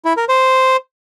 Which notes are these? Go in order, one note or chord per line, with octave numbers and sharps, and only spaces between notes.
E4
A#4
C5